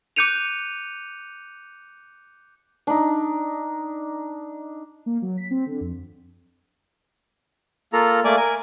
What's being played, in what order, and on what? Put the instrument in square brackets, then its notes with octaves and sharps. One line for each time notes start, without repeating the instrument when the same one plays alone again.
[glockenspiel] D6 F#6 G6 C#7 D#7 F7
[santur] D4 D#4
[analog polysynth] A#3
F#3
B6
C4
D3
F2
[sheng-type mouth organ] A#3 F4 A4 A#5
A3 A#3 D5 G#5
A#4 G#5